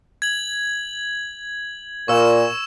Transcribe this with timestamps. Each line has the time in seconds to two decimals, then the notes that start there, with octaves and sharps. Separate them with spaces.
0.22 G#6 F#7
2.08 A#2 C#6 E6 E7